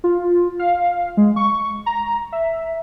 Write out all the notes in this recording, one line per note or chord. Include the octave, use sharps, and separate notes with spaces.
F4
F5
G#3
C#6
A#5
E5